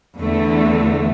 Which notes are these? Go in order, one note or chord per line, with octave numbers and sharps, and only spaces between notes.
E2 D3 A3